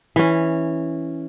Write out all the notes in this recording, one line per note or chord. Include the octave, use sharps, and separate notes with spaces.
E3 C#4